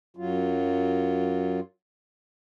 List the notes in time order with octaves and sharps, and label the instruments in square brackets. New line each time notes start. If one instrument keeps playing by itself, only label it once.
[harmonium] F#2 F#3 F4